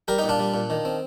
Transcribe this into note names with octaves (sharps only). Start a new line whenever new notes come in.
G3 G4 A#4
D#4 G4
A#2
D4 F4
G3
A#2
D#3
C4